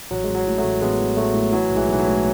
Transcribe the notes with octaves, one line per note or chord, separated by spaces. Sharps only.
A1 F#3
A1 G#3
F#3
A2
F#3 A3
A1
A1 G#3 B3
E3
A1 F#3 A3
A2
E3 F#3
B1
E3 G#3
B1 E3
F#3
A2